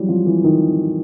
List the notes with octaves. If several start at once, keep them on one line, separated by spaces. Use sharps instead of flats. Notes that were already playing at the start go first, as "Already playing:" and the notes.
Already playing: E3 F#3 G3
F3
E3
D#3